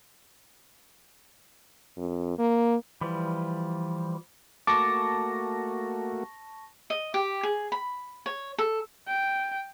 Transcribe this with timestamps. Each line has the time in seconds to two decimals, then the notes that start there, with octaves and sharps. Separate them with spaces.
1.98 F2
2.38 A#3
3.01 E3 F3 G3
4.67 A3 A#3 F#4 A5 C#6 D6 A#6
6.90 D#5
7.14 G4
7.43 G#4
7.72 B5
8.26 C#5
8.58 A4
9.08 G5